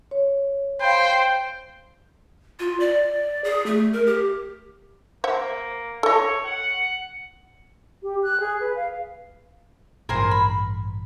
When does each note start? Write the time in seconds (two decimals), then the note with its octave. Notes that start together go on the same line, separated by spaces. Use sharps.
0.11 C#5
0.81 C5 F5 G5 B5
2.59 F4
2.80 D5
3.44 G#4
3.66 A3
3.93 A#4
4.07 G4
5.24 A#3 C5 E5 F#5
6.03 A4 C#5 D#5
6.44 F#5
8.03 G4
8.23 F#6
8.40 G#4
8.61 B4
8.76 F5
10.09 A1 G2 A#4 C5 G#5
10.31 B5